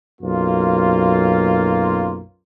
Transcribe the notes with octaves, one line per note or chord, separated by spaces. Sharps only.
B1 F#2 A#3 F4